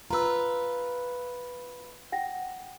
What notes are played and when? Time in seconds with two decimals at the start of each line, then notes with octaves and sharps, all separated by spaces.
0.10 F4 B4 A#5 E6
2.12 F#5 G5 A#6